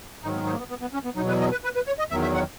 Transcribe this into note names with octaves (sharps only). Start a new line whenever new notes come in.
G#2 D#3 F#3 D#4
B3
D#4
A#3
B3
B3
B3
C#4
B3
E2 B2 F#3 D#4
B4
D#5
B4
B4
B4
C#5
D#5
E2 D#3 F#3 E5
E5
F#5